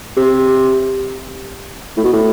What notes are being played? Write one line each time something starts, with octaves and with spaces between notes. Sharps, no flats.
C3
A2
B2
A2